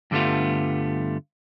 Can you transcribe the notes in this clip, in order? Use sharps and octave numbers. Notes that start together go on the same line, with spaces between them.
G2 D3 G3 A3 B3 F4